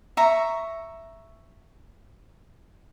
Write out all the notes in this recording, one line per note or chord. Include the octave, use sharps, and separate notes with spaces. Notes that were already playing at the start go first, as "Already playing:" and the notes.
E5 A#5 C#6